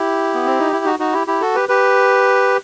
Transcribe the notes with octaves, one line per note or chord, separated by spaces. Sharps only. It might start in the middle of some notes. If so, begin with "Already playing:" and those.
Already playing: E4 G4
B3
C4
D#4
E4
D#4 F#4
D#4 F#4
E4 G4
E4 G4
F#4 A4
G4 B4
G4 B4